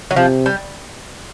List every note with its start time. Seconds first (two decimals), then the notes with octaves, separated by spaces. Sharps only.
0.11 F#3
0.16 C3 F3
0.46 G3